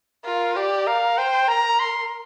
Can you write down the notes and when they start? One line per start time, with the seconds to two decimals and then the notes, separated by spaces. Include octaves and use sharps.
0.25 F4 A#4
0.56 G4 D5
0.87 A#4 F5
1.18 C5 G5
1.48 A#4 A#5
1.80 C6